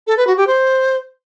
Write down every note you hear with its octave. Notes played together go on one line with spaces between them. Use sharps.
A4
B4
F#4
G4
C5